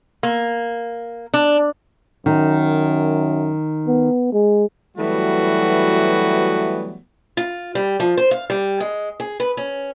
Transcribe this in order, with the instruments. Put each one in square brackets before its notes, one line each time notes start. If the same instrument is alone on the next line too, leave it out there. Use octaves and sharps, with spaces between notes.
[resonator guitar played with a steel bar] A#3
D4
[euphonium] F#2 [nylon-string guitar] D#3
[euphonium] B3
G#3
[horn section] E3 F#3 G3 A3 B3 F#4
[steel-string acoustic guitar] F4
G3
F3
C5
F5
G3
G#3
G#4
B4
C#4